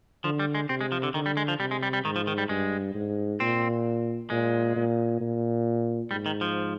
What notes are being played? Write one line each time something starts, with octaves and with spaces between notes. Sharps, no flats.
D3 F3
G3
G#3
C3 C4
G#3
F3
D3
D3 D#3
G3
G#3
F3
C3 G3
G#3
G3
G3
G#2 D#3
F3
D#3
G3
G2 G#3
G#2
A#2 C4
A#2 G#3
A#2
A#2
G#2 G3
D#3
F3